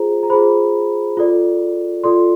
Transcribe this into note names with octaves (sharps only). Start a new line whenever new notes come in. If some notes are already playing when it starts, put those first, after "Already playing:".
Already playing: F4 G#4 C5 A#5
A#5
F4 G#4 C5 B5
F4 A4 D5
F4 A4 D5 C6